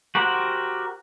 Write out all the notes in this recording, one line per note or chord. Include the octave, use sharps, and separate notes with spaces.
F#4 G4 A#4 C5 F#5